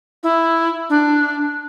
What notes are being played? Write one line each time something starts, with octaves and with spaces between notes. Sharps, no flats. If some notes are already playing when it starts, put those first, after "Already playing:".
E4
D4